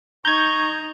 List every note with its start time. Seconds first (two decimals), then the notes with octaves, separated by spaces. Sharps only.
0.25 D#4 D#5 A#5 C#6 G6 G#6